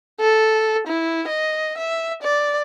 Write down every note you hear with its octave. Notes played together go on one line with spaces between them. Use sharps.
A4
E4
D#5
E5
D5